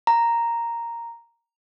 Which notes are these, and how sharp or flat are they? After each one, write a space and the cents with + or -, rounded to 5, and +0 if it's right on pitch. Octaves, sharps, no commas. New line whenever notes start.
A#5 -5